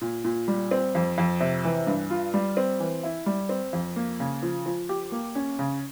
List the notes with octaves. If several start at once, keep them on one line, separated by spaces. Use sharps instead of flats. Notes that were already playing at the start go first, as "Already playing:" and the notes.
A#2
A#2
G3
C4
F2
F2
C3
E3
G2
F4
G3
C4
E3
E4
G3
C4
F2
A#3
C#3
F3
F3
G4
A#3
C#4
C#3